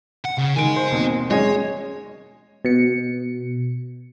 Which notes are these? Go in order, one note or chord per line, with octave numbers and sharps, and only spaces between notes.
F#5
C#3
D#3 D#5 G#5 D7
C5
D#2 B2 C4
G#3 C#4 C#5 D#5
B2 C#7